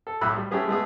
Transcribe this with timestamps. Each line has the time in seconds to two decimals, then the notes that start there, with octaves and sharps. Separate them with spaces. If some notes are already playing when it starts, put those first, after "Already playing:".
0.07 A4
0.21 B1 A2 B5 E6 F#6
0.36 G3
0.51 A3 C#4 G4 G#4 B4
0.68 G#3 A3 B3 G#4